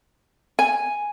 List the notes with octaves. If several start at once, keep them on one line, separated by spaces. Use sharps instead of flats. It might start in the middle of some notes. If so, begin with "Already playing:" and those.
G#5